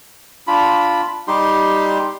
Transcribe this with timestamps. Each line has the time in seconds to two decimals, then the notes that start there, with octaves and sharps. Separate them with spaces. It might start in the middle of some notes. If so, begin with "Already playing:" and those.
0.47 D4 F4 B5
1.28 G3 D#4 G4 C6